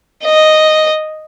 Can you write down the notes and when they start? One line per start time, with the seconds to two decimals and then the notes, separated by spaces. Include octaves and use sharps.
0.24 D#5